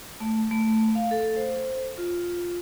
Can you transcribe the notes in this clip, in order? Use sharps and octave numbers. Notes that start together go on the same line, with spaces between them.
A3
A3
F5
A4
C5
F4